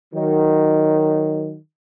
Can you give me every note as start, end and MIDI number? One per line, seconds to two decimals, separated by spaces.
0.14 1.57 51
0.14 1.57 54